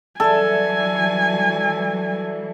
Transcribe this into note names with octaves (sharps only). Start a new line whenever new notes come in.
E3 F#3 G3 A4 D5 E5 G#5 A5